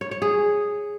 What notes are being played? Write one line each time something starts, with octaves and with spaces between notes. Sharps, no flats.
C#5
C#5
G#4